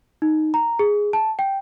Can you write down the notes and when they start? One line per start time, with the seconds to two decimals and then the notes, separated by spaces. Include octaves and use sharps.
0.22 D#4
0.54 A#5
0.79 G#4
1.13 A5
1.39 G5